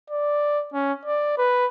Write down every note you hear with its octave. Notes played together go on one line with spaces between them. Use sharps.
D5
C#4
D5
B4